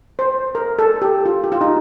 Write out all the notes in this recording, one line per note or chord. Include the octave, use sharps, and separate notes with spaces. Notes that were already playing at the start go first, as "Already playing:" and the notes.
C5
A#4
A4
G4
F4
G4
F4
D#4